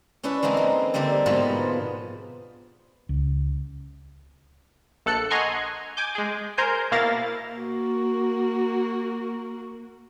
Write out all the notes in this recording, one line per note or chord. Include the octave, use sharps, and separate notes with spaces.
C#4 D4 E4 B4
E3 G#3 A#3 C4 D#4
A#3
D3 G3 A#3 C4 D4
G#2 B2 F3 B3 F4
C#2
A#1 A4 F#6 C#7
D#5 F#5 G#5 A#5 C6 C#6
G#5 D6 G6
G#3 G#4
A#4 C5 G#5 G6
B2 A#3 E4 F5 A6 A#6
A#3 F#4